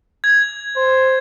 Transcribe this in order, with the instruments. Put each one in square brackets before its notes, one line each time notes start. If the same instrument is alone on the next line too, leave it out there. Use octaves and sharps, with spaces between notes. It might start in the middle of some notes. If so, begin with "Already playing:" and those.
[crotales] G#6
[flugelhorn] C5